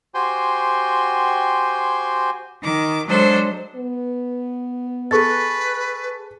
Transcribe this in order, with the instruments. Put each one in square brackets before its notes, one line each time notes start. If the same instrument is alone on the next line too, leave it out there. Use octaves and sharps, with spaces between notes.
[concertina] F#4 G4 C5 G5 G#5 C6
[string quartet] D#3 D6
F#3 G#3 D4 A4 C5
[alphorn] B3
[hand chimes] G#4 C#6 A6 [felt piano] A4 [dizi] B4